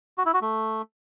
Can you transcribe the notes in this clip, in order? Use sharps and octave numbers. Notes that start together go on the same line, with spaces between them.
F#4
E4
F#4
A3